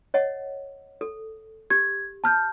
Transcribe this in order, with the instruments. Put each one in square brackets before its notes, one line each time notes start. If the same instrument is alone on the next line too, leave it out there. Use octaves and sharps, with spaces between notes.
[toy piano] C#5 D#5 F#5
A4
[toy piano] G4 [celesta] G#6
[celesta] A5 F6 G6